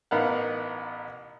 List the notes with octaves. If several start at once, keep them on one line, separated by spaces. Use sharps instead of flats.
A1 B3 D#4 A#4 F5 F#5